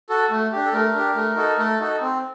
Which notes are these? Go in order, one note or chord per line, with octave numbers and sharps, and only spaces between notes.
F#4 A4
A3
D4 G4
A4
A3 A#4
D4 G4
A3
D#4 F#4 A4
A3 A4
D#4 F#4 A4
C4